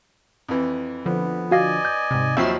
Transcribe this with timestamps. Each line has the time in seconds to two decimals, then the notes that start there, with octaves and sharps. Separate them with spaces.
0.48 F2 E3
1.06 D3 F3 B3
1.51 F#4 D5 D#5 F5 G#5 A#6
1.85 G6
2.11 G#2 C3
2.37 D#2 F3 F#3 E5 B5 C7 E7